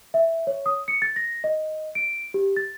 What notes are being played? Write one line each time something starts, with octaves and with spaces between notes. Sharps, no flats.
E5
C#5
D#6
C#7
A6
A#6
D#5
D7
G4
A6